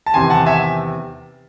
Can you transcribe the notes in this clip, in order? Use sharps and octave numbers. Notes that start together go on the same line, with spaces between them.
A5
E2 C3 D#3 G#5 C6
F#5 A5
E5 G#5